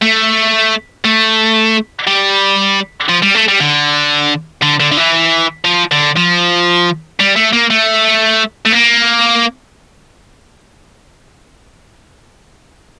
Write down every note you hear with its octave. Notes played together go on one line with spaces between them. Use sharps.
A3
A3
G3
F3
G3
A3
G3
D3
D3
D3
D3
E3
F3
D3
F3
G3
A3
A#3
A3
A3
A#3